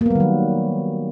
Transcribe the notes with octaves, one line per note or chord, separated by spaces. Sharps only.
D#3 F#3 G3 A#3 B3